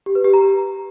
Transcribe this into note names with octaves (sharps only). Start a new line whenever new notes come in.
G4
B4
G4
A#5